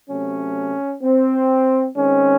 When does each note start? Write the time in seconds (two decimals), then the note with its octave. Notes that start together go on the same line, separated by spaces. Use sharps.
0.10 C3 F#3 A3 C#4
1.03 C4
1.96 D#3 G#3 C4 C#4